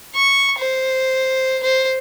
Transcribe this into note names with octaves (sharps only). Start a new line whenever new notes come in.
C#6
C5
C5